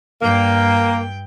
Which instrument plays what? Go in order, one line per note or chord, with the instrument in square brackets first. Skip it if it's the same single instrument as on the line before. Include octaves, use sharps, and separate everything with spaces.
[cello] G2 G5 [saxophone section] A#3